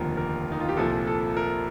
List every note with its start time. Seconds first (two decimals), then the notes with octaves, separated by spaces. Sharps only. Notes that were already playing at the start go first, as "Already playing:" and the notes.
Already playing: F1 D#2 D3 F3 A#4
0.17 A#4
0.52 D#4
0.60 F4
0.69 G4
0.77 C2 A#2 F3 A4
1.07 A4
1.37 A#4